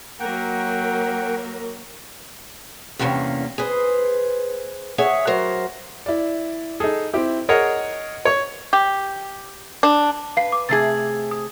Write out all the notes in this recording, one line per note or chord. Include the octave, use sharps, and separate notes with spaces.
F#3 A#3 A#4 F#5 G5
E2 G2 C3 A#3 C#4
G#4 B4 C5
G#4 C#5 E5 F#5
F#3 A#4 C5
E4 D5
D#4 G#4 A4
C4 E4 G4
G#4 A#4 C#5 D#5 F#5
C#5 C#6
G4
D4
B4 F5 C7
D6
C3 A3 G#4 A6 C7
D#6